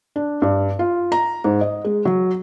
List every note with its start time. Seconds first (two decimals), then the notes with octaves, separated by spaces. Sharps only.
0.16 D4
0.42 G2
0.79 F4
1.12 A#5
1.44 G#2
1.61 D#5
1.85 G#3
2.05 F#3